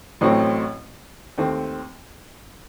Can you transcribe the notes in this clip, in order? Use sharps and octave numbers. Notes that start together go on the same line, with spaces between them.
A1 A2 F#3 C4
D#2 D#3 A3 C4